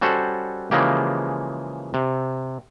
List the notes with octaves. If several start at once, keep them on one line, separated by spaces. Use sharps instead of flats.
G3 C#4 F#4 A4 C5 F#5
C#3 E3 F3 G#3 A#3 G4
C3